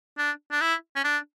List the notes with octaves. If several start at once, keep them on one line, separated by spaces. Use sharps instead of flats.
D4
D4
E4
C#4
D4